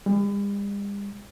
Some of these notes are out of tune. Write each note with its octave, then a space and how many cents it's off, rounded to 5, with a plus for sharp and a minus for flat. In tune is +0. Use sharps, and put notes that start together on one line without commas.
G3 +45